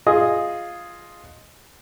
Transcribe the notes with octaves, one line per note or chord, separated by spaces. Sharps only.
F4 G#4 D#5 G#5 D#6